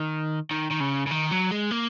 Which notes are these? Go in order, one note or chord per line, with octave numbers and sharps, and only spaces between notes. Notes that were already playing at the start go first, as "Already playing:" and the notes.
Already playing: D#3
D#3
D#3
C#3
C#3
D#3
F#3
G#3
A#3